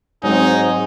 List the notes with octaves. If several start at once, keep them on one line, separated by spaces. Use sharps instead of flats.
G#2 F#3 G#3 C4 D#4 G#4